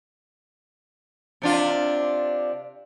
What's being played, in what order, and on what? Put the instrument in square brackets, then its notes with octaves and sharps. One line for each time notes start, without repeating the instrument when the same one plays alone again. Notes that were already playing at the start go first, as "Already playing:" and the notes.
[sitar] C3 D4 F4